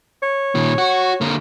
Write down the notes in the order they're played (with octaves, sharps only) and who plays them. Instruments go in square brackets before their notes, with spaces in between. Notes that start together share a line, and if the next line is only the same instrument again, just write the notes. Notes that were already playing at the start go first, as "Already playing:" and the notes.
[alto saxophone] C#5
[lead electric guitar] A#2 D#3
F#4
D3 A#3